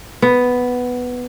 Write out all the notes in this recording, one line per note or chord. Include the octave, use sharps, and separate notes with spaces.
B3